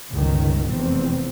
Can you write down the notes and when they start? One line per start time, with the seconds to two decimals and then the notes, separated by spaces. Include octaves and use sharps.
0.12 G1 C#2 D#3
0.71 F1 E2 C4